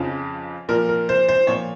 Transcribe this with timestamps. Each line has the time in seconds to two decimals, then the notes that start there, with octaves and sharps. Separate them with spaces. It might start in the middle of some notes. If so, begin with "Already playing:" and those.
Already playing: F2 C#3 F3
0.69 A#2 F3 A#4
0.89 A#4
1.09 C5
1.29 C5
1.47 A#2 F3 C#5